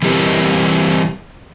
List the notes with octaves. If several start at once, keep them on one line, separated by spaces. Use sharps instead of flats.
E3 G3 C4 G4 A#4 B4